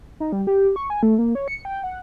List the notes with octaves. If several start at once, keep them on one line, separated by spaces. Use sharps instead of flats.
D#4
G3
G4
C#6
G#5
A3
A#3
C#5
C#7
G5
F#5